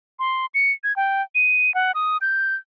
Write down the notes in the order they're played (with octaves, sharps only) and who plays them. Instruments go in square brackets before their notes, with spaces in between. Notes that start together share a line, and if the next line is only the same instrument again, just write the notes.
[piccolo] C6
C#7
G#6
G5
D#7
F#5
D#6
G6